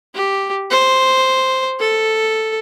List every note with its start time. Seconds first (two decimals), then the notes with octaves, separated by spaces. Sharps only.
0.14 G4
0.71 C5
1.80 A4